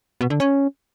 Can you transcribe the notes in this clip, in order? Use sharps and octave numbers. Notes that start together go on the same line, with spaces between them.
B2
D3
C#4